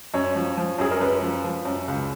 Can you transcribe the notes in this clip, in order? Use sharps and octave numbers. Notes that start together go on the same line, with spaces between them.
F#2 C#5
F3
F3
F#2 G#4
A#4
F#2 B4
F3
F3
F#2
C#2